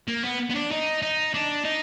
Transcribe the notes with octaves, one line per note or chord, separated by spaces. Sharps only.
A#3
B3
B3
D4
D#4
D#4
D4
D#4